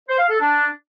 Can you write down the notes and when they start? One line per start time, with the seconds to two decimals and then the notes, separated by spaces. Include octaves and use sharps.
0.08 C5
0.19 F5
0.29 A4
0.40 D4